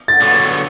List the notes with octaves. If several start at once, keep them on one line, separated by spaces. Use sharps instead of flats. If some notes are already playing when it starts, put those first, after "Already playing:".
A6
D3 F#3 B3